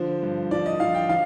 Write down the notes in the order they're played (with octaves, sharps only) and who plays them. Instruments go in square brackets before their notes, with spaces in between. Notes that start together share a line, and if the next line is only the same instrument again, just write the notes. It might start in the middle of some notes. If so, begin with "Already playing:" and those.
Already playing: [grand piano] D3 F3 C5
G2
F3 D5
D#5
F3 F5
G5
F3 F5